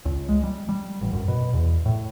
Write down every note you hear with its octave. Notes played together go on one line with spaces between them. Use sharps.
C#2
G#3
G3
G3
A1
F#2
B2
E2
A2